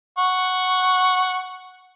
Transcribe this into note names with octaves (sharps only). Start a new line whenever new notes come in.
F#5 C#6